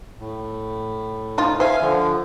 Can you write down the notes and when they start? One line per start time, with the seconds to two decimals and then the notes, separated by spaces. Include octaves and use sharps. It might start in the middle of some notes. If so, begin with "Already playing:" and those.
0.19 A2
1.38 F3 D#4 F4
1.60 C5 E5 F5 G#5
1.81 D3 F3